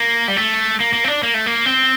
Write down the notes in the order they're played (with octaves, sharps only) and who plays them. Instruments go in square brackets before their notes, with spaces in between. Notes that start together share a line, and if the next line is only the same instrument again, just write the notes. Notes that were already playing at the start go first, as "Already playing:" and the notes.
Already playing: [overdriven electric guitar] A#3
G3
A3
A#3
A#3
C4
D4
A#3
A3
A#3
C4